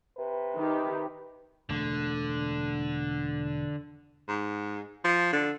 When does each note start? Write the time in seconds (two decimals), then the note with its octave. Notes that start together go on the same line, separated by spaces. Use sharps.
0.17 C3 B4
0.57 D#3 G4
1.69 E1 D3 A3
4.28 G#2
5.04 F3
5.33 D3